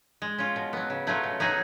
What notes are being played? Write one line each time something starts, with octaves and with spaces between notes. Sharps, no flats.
G#3
C#4 F4
B2
F#3 B3
C#3
F#3 A3 C#4 F4
B2
F#3 B3 D#4 G#4